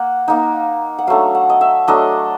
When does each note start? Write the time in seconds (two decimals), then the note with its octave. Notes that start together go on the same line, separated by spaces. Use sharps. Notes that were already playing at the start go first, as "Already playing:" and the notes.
Already playing: A#3 F#5
0.28 A#3 D#4
0.98 F#5
1.07 F#3 A3 D4 F5
1.35 F#5
1.50 D#5
1.61 E5
1.88 F#3 A3 D4 D#5